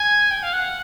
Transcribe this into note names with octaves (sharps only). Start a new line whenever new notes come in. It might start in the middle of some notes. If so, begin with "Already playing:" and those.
Already playing: G#5
G5
F5
F#5